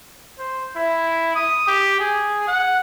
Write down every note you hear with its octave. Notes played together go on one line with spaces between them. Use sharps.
C5
E4
D#6
G4
G#4
F#5